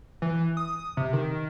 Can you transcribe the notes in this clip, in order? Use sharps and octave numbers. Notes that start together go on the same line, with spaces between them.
E3
D#6
C3
D#3